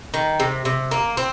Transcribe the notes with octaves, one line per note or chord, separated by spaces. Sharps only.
D#3
C3
C3
A#3
C4